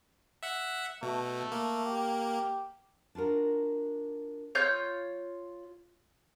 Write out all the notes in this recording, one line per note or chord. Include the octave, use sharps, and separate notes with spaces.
E5 F#5
B2 A3
A#3
G4
D4 F4 F#4 A#4
F4 C#5 G6